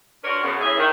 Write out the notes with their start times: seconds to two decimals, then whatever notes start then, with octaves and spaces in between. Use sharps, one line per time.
0.24 D4 F4 F#4 A#4 B4 C#5
0.42 F#2 C#3 B3
0.61 A2 E3 C#4 G#4 E5
0.78 D#3